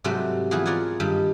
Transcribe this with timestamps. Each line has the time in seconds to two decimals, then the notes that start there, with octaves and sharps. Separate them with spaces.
0.04 G#2 C3 F#3 G3 A3
0.51 E3 F3 B3 G#4 B4
0.66 F4 A#4 D5 F#5 G#5
1.00 G2 D#3 G3